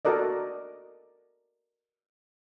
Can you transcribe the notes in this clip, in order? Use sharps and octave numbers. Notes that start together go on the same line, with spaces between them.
F#4 A4 A#4 D5 D#5